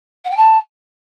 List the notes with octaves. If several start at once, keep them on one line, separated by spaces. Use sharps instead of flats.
F#5
G5
A5